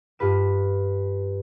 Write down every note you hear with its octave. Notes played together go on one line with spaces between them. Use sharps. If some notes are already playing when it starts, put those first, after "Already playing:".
G2 F4 B4 E7